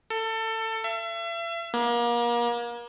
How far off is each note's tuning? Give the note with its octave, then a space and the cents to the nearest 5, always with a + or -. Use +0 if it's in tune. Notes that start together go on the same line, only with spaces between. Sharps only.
A4 +25
E5 +40
A#3 +35